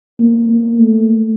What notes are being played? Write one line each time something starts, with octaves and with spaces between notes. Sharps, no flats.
A#3
A#3
A3